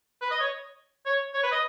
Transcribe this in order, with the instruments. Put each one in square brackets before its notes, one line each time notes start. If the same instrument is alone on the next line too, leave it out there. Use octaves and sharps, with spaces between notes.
[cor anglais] B4
D#5
C#5
C#5
C#5
B4
D#5